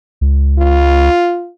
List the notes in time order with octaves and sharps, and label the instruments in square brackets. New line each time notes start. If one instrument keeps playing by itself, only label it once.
[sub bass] C#2
[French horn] F4